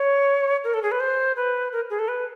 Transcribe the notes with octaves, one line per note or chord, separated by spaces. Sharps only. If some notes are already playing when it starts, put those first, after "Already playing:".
Already playing: C#5
A#4
A4
G#4
B4
C5
B4
A#4
G#4
A4
B4